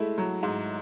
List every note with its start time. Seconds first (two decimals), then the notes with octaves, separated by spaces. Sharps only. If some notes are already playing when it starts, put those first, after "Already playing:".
Already playing: G#3 A3 E4
0.18 F#3
0.43 G#2